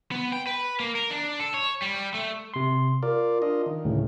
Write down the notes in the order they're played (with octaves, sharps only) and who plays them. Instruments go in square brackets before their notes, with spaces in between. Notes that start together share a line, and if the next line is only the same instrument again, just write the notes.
[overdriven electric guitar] B3
G5
B4
A#3
A#4
D4
A4
C#5
G3
A3
[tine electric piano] C3 C6
[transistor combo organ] F4 D5 [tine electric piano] A#4
[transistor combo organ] D4 F4 D#5
D#3
[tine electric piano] D2 A2 C#3